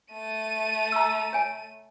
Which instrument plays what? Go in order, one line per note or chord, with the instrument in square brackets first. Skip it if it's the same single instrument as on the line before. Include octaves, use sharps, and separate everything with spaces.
[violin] A3 D#7
[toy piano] A#5 E6
C#5 G#5